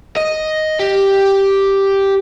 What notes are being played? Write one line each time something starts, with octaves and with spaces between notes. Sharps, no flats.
D#5
G4